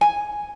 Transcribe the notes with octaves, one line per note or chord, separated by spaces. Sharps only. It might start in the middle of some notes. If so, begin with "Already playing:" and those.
G#5